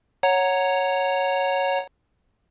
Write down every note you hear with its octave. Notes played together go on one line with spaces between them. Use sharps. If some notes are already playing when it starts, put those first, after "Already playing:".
C#5 F#5 A#5